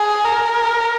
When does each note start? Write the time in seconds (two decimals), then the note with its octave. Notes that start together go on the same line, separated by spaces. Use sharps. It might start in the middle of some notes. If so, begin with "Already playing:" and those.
Already playing: G#4
0.26 A#4